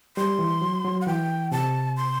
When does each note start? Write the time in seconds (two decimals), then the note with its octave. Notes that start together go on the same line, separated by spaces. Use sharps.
0.17 G3 C6
0.39 E3
0.61 F#3
0.84 F#3
1.01 F#5
1.07 E3 G5
1.52 C3 A5
1.97 C6